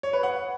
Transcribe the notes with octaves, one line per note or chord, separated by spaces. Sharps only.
C#5
B4
F#5